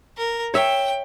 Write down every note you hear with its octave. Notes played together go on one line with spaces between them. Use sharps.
A#4
C#5 E5 G5